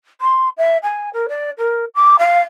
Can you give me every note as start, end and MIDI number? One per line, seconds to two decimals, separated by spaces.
0.21 0.49 84
0.57 0.77 76
0.83 1.10 80
1.13 1.26 70
1.29 1.50 74
1.58 1.85 70
1.95 2.16 86
2.19 2.41 77